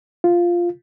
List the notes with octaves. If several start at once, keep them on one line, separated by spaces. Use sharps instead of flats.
F4